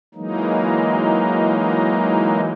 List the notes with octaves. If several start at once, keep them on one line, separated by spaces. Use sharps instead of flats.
E3 F#3 G#3 A#3 D#4